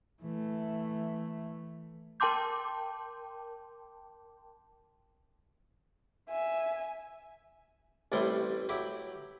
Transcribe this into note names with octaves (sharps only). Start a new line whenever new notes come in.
E3 A3
A#4 G5 A5 C6 D6 G6
E5 G#5
A1 A2 C3 G3 E4 C6
F#3 E4 G4